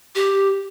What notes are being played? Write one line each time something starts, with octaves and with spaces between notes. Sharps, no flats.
G4